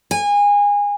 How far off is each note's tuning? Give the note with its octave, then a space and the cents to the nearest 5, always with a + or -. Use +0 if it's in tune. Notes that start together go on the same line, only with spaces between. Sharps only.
G#5 -25